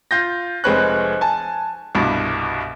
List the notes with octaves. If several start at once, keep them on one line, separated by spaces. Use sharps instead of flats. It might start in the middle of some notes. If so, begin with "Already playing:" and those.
F4 G6 A#6
F1 G#3 C4 B4 C#5 F#6
G#5 A5
C2 G2 B2